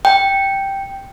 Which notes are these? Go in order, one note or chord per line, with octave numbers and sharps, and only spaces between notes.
G5